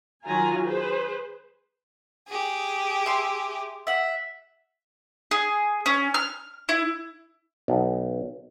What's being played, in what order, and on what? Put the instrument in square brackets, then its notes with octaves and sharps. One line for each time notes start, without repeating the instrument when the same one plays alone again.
[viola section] D#3 F#3 F4 G#5 A#5
G#4 B4 C5
[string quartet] G4 G#4
[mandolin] E5 C6
E5 F#5
G#4
C#4
F6
E4
[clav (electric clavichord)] B1